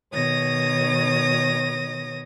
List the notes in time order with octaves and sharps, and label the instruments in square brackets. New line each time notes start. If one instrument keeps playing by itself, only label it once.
[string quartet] B2 D#3 C#5 D#6 A#6